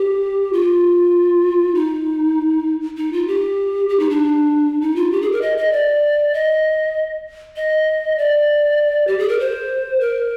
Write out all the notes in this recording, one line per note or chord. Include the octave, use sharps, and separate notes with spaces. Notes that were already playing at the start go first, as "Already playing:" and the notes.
Already playing: G4
F4
D#4
D#4
F4
G4
G4
D#4
D4
D#4
F4
G4
G#4
A#4
D#5
D#5
D5
D#5
D#5
D5
G4
G#4
A#4
C5
A#4